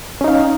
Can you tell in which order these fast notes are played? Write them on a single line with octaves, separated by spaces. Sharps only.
C#4 D#4 F5